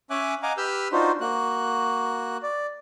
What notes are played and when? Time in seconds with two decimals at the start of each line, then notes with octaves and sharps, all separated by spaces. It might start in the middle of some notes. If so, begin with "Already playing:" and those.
0.10 C#4 C#5 E5 G#5 D6 F#6
0.43 D#5 F5 F#5 G#5 A#5 D6
0.57 G4 B4 E6 F6 G6
0.92 D4 D#4 F4 F#4 C5
1.21 A#3 F#4 F#6
2.43 D5